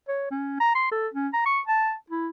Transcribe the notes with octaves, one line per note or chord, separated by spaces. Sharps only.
C#5
C#4
A#5
C6
A4
C#4
A#5
C#6
A5
E4